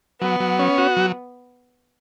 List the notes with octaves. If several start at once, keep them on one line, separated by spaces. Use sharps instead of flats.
F#3 B3
F#3
C#4
F#4
F#3